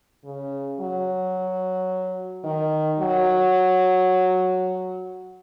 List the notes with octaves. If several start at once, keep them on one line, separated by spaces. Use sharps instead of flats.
C#3
F#3
D#3
F#3